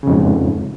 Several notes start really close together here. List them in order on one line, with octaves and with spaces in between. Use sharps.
C#3 F2 G#2